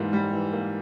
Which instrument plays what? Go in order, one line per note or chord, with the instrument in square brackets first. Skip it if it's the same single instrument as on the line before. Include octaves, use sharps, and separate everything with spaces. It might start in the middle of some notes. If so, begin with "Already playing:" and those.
Already playing: [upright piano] G#2 E3 G3 A#3
G3
E3
A#3